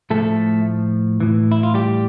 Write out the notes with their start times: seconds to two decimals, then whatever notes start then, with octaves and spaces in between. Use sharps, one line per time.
0.10 A2 F3 A3 A4
1.20 A2 E3
1.52 E4
1.63 F4
1.74 G3 G4